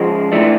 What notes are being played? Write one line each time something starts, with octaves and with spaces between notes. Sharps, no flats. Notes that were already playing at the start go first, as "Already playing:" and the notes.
Already playing: C#3 F3 G#3
A2 E3 A3 D4